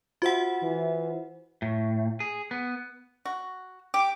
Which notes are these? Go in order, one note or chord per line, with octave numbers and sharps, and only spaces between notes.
F4 F#4 C5 E5 F#5
E3
A2
G#4
B3
F#4
G4 D6